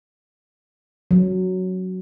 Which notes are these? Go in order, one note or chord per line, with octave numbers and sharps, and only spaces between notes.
F#3